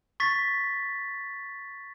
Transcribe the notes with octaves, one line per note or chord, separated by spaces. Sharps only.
C#6 A6 B6